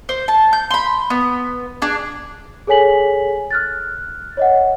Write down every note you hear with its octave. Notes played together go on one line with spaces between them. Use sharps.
C5
A5
G6
B5 C6
B3
D4 G#4
G#4 A4 C#5 G#5 B6 F#7
F6 F#6 A6
C#5 D#5 F#5